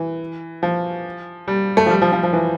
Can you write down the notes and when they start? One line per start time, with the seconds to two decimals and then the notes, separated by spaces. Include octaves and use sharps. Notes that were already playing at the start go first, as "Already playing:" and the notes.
Already playing: E3
0.63 F3
1.48 G3
1.77 A3
1.86 F3
1.90 G3
2.02 F3
2.12 F3
2.23 F3
2.33 E3